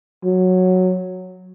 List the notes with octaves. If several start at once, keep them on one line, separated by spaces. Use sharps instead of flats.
F#3